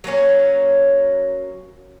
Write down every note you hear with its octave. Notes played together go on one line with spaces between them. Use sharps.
F#3 A#3 C#4 C#5